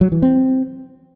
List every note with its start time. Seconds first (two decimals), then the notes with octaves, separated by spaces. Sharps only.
0.01 F#3
0.12 E3
0.22 C4